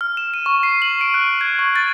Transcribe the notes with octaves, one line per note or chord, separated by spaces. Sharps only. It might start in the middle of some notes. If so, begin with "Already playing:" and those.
F6
E7
D#7
C#6
C7
F#7
D7
F#6
G#6
C#6
A6